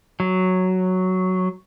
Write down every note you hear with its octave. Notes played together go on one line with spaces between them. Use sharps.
F#3